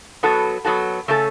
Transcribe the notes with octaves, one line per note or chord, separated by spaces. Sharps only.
F#3 B3 F#4 A4
F#3 B3 F#4 A4
C#3 A3 C#4 A4